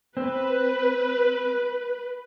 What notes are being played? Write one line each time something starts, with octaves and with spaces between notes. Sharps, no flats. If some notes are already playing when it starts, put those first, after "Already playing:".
C4 B4